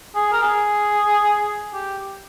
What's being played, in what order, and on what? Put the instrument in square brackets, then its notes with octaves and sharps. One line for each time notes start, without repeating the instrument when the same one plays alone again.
[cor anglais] G#4
A#4
G#4
G4